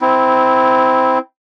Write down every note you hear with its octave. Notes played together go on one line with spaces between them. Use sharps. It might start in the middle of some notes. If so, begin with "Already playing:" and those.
C4 E4